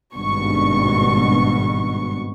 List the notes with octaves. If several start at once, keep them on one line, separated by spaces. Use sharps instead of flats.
G#1 G2 B2 C#6